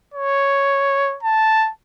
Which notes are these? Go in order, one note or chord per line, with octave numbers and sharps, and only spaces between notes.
C#5
A5